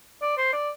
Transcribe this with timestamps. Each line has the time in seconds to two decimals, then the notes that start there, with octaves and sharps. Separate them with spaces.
0.21 D5
0.37 C5
0.53 D5